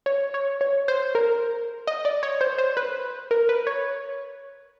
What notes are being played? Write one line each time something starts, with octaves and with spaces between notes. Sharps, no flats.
C#5
C#5
C#5
C5
A#4
D#5
D5
C#5
C5
C5
B4
A#4
B4
C#5